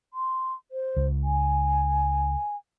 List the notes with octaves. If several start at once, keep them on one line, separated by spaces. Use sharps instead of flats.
C6
C5
C#2
G#5